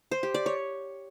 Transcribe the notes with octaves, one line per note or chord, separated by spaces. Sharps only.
C5
G4
D5
C#5